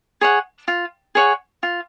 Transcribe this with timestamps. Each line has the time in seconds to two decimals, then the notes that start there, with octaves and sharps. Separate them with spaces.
0.21 G#4 C#5 F#5
0.68 F4
1.15 G#4 C#5 F#5
1.63 F4